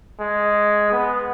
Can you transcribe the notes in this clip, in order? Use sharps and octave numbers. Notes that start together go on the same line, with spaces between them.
G#3
B3